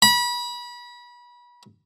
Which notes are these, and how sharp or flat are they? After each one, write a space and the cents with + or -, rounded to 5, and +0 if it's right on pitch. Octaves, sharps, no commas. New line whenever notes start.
B5 -30